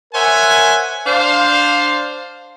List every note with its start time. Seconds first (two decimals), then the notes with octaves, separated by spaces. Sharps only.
0.14 A#4 C5 C#5 E5 F#5 G#5
1.07 D4 C5 F5